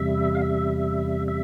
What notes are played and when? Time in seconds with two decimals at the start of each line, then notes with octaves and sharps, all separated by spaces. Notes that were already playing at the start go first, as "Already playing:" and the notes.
Already playing: E2 C3 G3 E5
0.35 F5
0.42 E5
1.28 E5